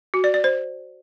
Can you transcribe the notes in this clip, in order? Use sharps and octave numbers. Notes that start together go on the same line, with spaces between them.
F#4
D5
D5
C5